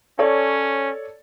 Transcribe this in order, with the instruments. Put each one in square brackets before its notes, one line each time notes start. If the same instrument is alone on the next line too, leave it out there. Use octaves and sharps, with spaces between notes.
[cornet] C#4 [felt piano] A4 C#5 D5